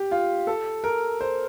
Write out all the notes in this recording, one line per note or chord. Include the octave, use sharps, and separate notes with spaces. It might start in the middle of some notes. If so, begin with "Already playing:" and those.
Already playing: G4
F4
A4
A#4
C5